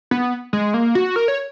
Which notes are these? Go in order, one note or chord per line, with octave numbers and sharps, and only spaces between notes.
B3
G#3
A#3
F#4
A#4
C#5